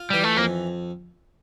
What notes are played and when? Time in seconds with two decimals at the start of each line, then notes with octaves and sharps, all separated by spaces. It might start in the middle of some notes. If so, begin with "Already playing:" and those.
Already playing: F4
0.10 E3 G3
0.24 A3
0.37 F2 A#3